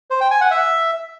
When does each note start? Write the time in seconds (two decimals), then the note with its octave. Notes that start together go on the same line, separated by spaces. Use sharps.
0.11 C5
0.21 G5
0.31 G#5
0.41 F#5
0.51 E5